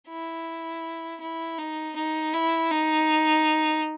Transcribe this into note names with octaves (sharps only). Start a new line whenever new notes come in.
E4
E4
D#4
D#4
E4
D#4